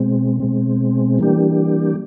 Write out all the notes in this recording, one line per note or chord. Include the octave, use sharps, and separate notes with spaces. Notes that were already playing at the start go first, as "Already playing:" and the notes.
Already playing: B2 G#3 C4
B2 G#3 C4
E3 G3 A#3 D4 G4